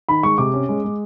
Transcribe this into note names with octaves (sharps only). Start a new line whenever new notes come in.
D#3 B5
G#3 C#6
C3 D6
C#4
G#3
G#3